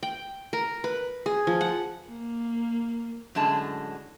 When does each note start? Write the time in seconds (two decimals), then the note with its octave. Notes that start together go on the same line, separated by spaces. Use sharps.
0.03 G5
0.53 A#4
0.84 B4
1.26 G#4
1.47 F3
1.61 F#5
2.09 A#3
3.35 F#2 A2 D3 G#3 A5